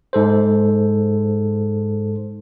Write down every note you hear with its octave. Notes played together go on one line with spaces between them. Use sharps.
G#2 A4 C5